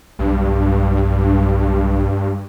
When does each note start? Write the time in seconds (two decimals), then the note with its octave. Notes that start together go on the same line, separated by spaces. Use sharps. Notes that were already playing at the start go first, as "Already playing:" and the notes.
0.19 B1 G2